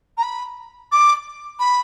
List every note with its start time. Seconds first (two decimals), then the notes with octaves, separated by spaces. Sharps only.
0.17 A#5
0.22 B5
0.91 D6
1.59 B5